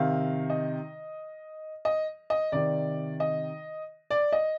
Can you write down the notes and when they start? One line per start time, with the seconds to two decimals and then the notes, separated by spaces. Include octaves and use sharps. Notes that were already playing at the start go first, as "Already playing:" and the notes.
Already playing: C3 D#3 F5
0.50 D#5
1.85 D#5
2.30 D#5
2.52 C3 D#3 D5
3.20 D#5
4.10 D5
4.32 D#5